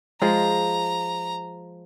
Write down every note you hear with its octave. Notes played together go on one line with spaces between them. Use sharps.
F3 G#3 A#5